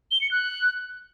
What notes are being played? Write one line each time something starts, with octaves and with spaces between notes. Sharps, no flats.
G7
C#7
F#6